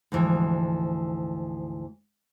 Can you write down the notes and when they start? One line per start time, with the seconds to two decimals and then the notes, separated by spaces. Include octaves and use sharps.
0.12 D2 G#2 E3 F3